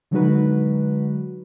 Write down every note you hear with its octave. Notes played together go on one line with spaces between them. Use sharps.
D3 F#3 G#3 D#4 F#4 B4